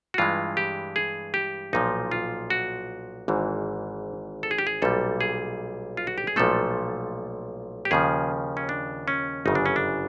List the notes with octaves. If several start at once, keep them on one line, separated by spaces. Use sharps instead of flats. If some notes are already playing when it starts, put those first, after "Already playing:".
F#4
G2 E3 G#3 F4
G4
G#4
G4
B1 A#2 F3 D#4
F4
F#4
G#1 G#2 E3
A4
G#4
G4
G#4
B1 A#2 G3 A4
G#4
F4
F#4
G4
G#4
B1 A#2 F3 A3 A4
G4
D#2 C#3 F3 G#4
C#4
D4
C#4
G1 F#2 C#3 D#4
D4
C#4
D4